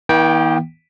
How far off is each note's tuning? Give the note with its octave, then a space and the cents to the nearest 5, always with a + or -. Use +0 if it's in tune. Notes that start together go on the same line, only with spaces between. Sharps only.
E3 -45 B3 -45 G5 +0